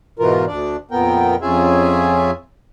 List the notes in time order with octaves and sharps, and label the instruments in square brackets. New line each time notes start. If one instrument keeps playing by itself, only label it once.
[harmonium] G#2 B2 E3 F4 A#4
D2 D4 D5
F2 A#2 B3 A#4 G5
F2 C#4 F4 G#4 E5 G#5